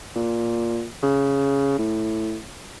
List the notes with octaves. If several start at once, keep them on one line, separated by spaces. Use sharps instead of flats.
A#2
C#3
A2